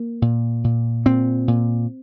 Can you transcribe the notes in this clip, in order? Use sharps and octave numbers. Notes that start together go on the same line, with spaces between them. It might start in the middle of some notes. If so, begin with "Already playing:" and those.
Already playing: A#3
A#2
A#2
A#2 C4
A#2